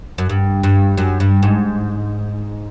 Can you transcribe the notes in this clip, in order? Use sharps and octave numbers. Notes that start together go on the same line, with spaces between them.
F#2
G2
G2
F#2
G2
G#2